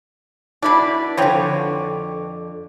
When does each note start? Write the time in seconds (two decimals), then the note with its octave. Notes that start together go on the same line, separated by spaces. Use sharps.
0.62 B2 D4 E4 B4 D5
1.17 F2 D3 C4 B4 C#5